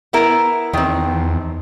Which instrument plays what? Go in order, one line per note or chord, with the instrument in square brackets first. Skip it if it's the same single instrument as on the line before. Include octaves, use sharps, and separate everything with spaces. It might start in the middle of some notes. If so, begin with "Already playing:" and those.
[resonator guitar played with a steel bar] B3 E4 A#4
[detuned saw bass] E2 [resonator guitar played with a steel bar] D#3 C4